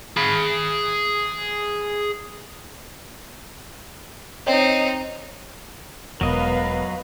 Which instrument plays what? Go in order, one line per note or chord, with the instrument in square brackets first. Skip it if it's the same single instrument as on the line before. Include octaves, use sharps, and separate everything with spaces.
[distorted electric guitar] G#4 B5
[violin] C4 D#4 [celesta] C#5 D#5 G5
[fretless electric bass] E1 [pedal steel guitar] F#3 D#5 [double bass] B3 [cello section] A#4 B4 F5